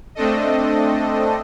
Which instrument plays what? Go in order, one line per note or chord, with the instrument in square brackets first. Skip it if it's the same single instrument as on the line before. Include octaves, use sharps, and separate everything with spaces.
[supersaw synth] A3 C4 D4 A4 D#5